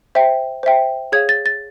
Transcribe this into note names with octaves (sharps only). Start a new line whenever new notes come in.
C5 E5 G5
C5 E5 G5
G#4 C#5 F5 G#6
A6
A6